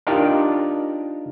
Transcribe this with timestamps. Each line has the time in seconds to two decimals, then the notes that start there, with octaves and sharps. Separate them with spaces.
0.07 D4 D#4 F4 G4 A#4